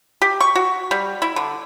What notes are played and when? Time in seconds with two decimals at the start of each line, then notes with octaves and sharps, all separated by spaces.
0.22 G4
0.40 C#6
0.55 F#4
0.91 G3
1.22 E4
1.36 D3